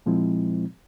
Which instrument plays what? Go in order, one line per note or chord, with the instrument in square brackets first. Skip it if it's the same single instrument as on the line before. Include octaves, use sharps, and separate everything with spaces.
[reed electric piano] A#2 F3 G#3 C4 E4